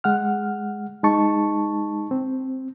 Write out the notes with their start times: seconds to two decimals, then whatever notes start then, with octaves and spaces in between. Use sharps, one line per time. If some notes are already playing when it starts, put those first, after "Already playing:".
0.04 G#3 F#5 F6
1.03 G#3 D#4 A5 C#6
2.11 C4